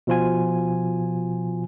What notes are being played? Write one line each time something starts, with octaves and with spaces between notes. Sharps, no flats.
B2 F3 F4 G#5